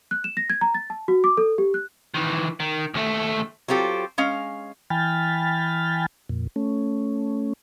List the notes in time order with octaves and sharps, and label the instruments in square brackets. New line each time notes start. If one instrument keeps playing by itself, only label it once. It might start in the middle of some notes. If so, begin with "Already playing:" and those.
[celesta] F#6
E7
A#6
G#6
A#5
A6
A5
F#4
D6
A4
G4
F#6
[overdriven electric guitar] D#3 E3
D#3
D#2 A3
[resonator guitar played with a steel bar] F#3 C4 F4 G4 A4
G#3 C#4 F5
[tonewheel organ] E3 G5 G#5 B5 F6 A6
F2 A#2
A3 C#4